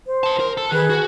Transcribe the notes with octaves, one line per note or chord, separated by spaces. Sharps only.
C5
B4 A5
A#4
A4 A5
D#3 G#4 B4 F#6
F#4